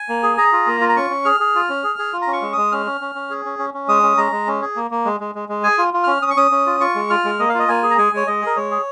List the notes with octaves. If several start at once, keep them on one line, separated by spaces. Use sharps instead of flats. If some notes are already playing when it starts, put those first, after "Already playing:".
Already playing: G#5
A#3
G#4
G#4 A#5
F4
A#3
F4
A#5
C#4 C#6
C#4
G#4 F6
G#4
F4
C#4
G#4
G#4
F4
A#5
C#4
C#6
G#3
G#3 D#6
C#4 F6
C#4
C#4
C#4
G#4
C#4
C#4
C#4
G#3 D#6
C#4
G#3 A#5
G#3
C#4
G#4
A#3
A#3
G#3
G#3
G#3
G#3
G#4 G#5
F4
F4
C#4 F6
C#4 D#6
C#6
C#4 D#6
C#4
F4
F4 C#6
G#3
F4 F6
G#3
A#3 D#5
F5
F4 D#5
A#3 G#5
G#4
A#5
G#3 G#5
G#3 C#5
G#3 D#5
G#4
A#4
G#3 C#5
G#4